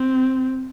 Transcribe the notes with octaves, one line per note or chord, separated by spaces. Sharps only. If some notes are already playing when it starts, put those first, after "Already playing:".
Already playing: C4